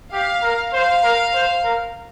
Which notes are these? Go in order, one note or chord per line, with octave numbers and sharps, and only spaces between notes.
G4 F5
A#4
C5 F5
A#4
C5
A#4